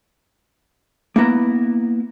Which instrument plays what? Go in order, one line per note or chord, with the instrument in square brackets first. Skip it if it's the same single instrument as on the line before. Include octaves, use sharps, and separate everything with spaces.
[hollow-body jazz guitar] A#3 B3 E4 A#5